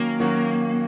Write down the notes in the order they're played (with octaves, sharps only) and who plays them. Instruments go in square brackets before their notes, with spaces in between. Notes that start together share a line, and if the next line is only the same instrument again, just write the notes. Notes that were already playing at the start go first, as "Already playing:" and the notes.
Already playing: [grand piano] D#3 F#3 C#4 [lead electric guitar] A#3
[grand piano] D#3 F#3 C#4 F#4